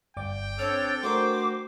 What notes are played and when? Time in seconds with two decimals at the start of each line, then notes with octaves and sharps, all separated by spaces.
0.17 G1 D5 G5 D6
0.59 C4 D4 A4 C#5 F6
1.03 A3 D4 F#4 A#4 C5 D6